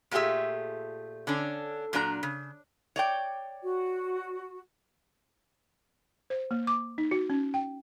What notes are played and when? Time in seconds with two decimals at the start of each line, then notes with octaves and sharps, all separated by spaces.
0.11 A#2 A3 F4 G4 G#4 E5
1.27 D3 C#4 D4
1.93 A#2 F#3 D4 A4 A#5
2.23 C#3
2.96 C#5 D5 G5
3.62 F#4
6.30 C5
6.51 A#3
6.67 D6
6.98 D#4
7.11 F#4
7.30 C#4
7.54 G5